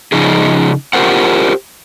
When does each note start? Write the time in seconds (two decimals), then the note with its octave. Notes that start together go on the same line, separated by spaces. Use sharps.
0.12 C#3 F3 D#4 G#4
0.93 F4 G4 G#4 A#4 C5 F#5